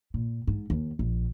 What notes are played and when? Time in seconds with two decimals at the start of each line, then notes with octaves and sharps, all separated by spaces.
0.14 A#2
0.47 G#2
0.70 D#2
0.99 A#1